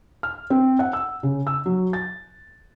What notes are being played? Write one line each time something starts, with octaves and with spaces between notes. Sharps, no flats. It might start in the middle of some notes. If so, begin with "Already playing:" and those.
F6
C4
F#5
E6
C#3
E6
F#3
A6